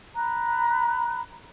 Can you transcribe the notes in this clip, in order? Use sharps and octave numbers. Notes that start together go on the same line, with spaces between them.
A#5 B5 F#6